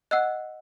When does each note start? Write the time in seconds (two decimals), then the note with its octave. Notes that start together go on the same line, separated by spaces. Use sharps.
0.11 D#5 F#5 E6 F#6